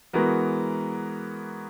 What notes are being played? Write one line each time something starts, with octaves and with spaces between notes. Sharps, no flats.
E3 G#3 B3 F#4 A#4